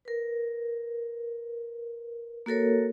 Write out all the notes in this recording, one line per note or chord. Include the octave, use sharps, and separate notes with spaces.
A#4 B4
A#3 F#4 A4 A#4 C#5